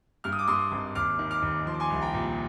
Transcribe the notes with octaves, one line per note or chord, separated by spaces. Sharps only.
G2 F6
D#6
D6
G2 C6 D#6
G#1
D#2 D6 F6
D#3
D6 F6
D#2
F3 C6
D6
G#5 C6
C2
G5 A#5
A#2